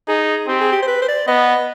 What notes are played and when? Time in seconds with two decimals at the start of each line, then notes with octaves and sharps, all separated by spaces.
0.08 D#4 G#4
0.48 C4 G4
0.61 G#4
0.72 G4
0.82 C5
0.87 B4
1.02 C5
1.08 D5
1.28 B3 D#5